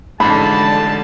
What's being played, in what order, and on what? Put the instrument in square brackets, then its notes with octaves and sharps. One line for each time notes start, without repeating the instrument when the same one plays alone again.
[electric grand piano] A1 F2 G#2 [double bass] D3 G#3 [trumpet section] A5 [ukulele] B5